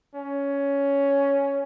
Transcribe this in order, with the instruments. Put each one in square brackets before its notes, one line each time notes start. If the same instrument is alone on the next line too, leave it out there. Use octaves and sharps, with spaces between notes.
[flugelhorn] C#4